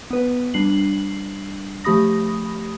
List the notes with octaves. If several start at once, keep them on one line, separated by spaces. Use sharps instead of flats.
B3 B4
G3 D4 C7 F#7
F3 A3 G4 B5 D#6 A#6